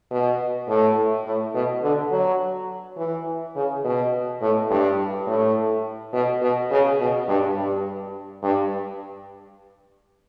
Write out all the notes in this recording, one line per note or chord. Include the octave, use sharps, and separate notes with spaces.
B2
A2
A2
B2
D3
F#3
E3
C#3
B2
A2
G2
A2
B2
B2
C#3
B2
G2
G2
G2